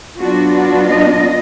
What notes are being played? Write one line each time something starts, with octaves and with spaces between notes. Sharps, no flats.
F#3 B3 D4 F4 F#4
F#4
D#5